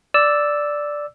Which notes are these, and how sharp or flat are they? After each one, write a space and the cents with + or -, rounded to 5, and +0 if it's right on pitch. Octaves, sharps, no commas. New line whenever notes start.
D5 +0 E6 +0